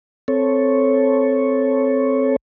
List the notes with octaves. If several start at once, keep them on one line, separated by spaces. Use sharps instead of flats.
C4 A4 C#5